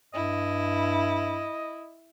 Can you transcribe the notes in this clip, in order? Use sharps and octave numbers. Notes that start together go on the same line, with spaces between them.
G2 E4 D#5